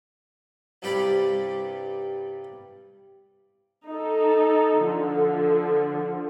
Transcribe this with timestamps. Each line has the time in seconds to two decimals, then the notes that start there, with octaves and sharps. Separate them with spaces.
0.82 C2 G2 G3 G4 D5 B5
3.88 D#4 A4
4.86 D3 F3